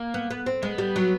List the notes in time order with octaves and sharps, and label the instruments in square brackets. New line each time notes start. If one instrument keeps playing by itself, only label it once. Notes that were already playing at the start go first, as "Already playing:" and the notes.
Already playing: [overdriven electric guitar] A#3
[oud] B3
B3
C4
[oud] G#3 [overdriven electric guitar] B3
[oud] G3
F#3